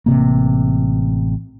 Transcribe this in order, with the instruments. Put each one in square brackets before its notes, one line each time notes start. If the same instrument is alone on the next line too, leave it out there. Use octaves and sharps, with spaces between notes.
[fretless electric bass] A1 C3 A#3